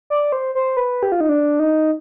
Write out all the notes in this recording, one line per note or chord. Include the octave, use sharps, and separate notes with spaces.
D5
C5
C5
B4
G4
F4
D#4
D4
D#4